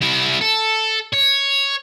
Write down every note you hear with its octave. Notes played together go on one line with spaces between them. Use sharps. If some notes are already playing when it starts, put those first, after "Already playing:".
G3 E4
A4
C#5